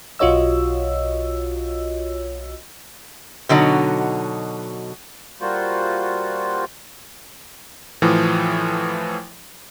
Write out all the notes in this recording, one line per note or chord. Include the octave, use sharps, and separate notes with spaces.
B1 F4 F#4 C#5 D#5 E6
B2 D3 F#3 D#4
G3 A#3 F4 F#4 C5
A2 E3 F3